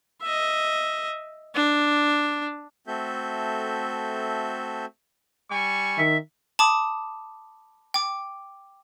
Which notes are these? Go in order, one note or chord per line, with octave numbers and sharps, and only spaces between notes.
D#5 E5
D4
A3 C4 F#4 A4 E5 G6
G3 G#5 C#6
D#3 E5
A5 B5 D6 D#6
G5 D6